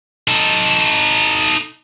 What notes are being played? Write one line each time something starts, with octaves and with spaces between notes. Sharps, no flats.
D#4 A4